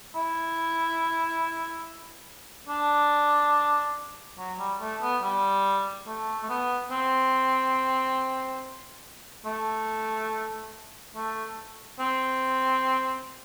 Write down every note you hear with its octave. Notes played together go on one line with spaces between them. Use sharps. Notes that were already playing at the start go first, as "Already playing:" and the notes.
E4
D4
F#3
G3
A3
B3
G3
A3
A3
B3
C4
A3
A3
C4